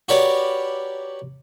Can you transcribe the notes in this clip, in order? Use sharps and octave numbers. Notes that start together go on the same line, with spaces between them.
F#4 G4 A#4 B4 C#5 D5